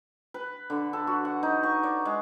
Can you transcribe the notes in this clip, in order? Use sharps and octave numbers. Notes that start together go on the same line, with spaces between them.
B4
D3
A4
F#4
F#5
D#4
C#6
D5
G#3